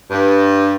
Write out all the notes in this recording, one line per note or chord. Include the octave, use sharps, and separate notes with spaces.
G2